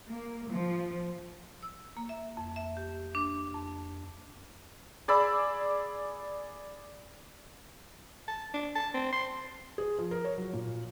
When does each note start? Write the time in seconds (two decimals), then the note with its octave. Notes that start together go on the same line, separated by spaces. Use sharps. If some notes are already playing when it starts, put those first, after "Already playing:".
0.10 A#3
0.49 F3
1.63 E6
1.97 A#3
2.09 E5
2.37 F2
2.56 E5
2.77 G4
3.15 D4
3.54 F2
5.08 G#4 D5 B5 E6
8.28 A5
8.54 D4
8.76 A5
8.94 C4
9.12 C6
9.78 G#4
9.99 F3
10.11 A#4
10.25 C#5
10.38 F#3
10.53 A#2